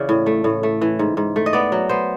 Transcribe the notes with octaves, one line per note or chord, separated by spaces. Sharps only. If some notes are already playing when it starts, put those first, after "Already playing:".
Already playing: C#3 E3 D5
A2
A3
A2
A3
E3
G#2
G#2
A3
D#5
B3 D5
F#3
B3 C5